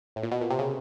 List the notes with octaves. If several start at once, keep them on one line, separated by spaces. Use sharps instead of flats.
A2
A#2
B2
A#2
C3
C#3